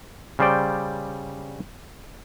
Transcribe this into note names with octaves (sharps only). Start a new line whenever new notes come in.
C#3 G3 C5 D5 G5